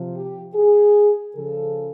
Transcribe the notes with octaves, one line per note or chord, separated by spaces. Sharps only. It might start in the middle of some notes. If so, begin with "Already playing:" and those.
Already playing: C3 F3
G4
G#4
C#3 F3 A4